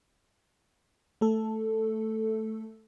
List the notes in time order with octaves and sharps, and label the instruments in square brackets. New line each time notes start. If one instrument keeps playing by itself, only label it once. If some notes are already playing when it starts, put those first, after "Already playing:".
[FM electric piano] A3 A4